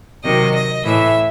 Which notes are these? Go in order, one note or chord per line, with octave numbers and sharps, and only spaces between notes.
C3 D#3 F#3 D#5
D#5
A2 E3 E5